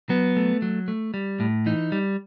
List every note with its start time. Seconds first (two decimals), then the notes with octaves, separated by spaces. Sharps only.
0.09 F#3 B3
0.37 A3
0.62 F#3
0.88 A3
1.14 G3
1.40 A2
1.66 E3 D#4
1.92 G3